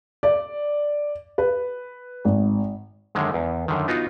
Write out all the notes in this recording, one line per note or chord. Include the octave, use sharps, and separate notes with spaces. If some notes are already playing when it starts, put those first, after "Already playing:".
D5
B4
G#1
F#2 D3 D#3 G#3
E2
F#2 D3 D#3
B3 D#4 F4 F#4